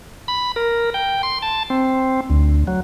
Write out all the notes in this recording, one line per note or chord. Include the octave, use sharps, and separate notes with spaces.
B5
A#4
G5
C6
A5
C4
D2
F#3